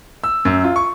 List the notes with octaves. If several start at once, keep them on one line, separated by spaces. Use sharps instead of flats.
E6
F#2
F4
C#6